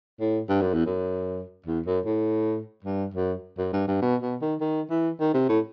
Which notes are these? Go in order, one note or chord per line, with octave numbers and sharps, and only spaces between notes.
A2
G2
F#2
E2
F#2
E2
F#2
A2
G2
F#2
F#2
G2
G2
B2
B2
D#3
D#3
E3
D#3
C3
A2